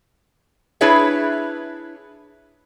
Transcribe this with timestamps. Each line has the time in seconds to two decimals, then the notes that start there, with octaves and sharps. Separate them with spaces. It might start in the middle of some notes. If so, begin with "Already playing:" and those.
0.81 D4 E4 G#4 B4 C#5 E5